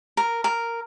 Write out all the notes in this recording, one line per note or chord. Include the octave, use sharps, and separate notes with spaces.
A#4
A#4